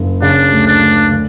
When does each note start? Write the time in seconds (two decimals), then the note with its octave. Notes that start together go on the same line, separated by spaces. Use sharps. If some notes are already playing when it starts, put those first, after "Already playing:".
Already playing: F#1
0.22 C#3 D4
0.52 D2
0.67 D4
0.81 D2
1.11 D3